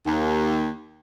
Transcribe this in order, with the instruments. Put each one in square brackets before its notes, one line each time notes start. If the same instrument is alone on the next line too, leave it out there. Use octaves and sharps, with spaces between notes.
[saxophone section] D#2